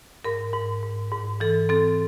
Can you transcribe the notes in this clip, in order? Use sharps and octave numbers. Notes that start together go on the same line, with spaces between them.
G#2 A#4
G#2
G#2
G#2
E3 A4
C4 A4